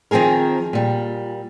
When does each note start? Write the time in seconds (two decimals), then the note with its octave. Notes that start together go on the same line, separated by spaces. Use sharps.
0.11 D#3 F3 C4 G#4 A#4
0.73 A#2 G3